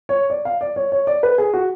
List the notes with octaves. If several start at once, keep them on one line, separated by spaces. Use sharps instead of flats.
C#5
D5
F5
D5
C#5
C#5
D5
B4
G#4
F#4